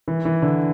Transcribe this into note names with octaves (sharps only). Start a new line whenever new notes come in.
E3
E3
D3